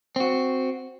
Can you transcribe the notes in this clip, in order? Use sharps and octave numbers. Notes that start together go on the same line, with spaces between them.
C4 F#4